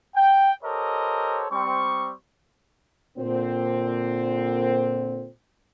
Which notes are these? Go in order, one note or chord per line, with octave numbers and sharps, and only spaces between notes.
G5
G4 A4 A#4 C5 C#5 D#5
G3 C4 C#6
A#2 D3 C4